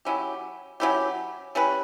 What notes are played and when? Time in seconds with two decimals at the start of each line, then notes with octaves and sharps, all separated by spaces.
0.05 F#3 C#4 E4 G4
0.80 F#3 C#4 E4 G4
1.55 G3 C#4 E4 B4